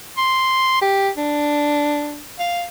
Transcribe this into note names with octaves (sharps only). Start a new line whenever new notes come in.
C6
G4
D4
F5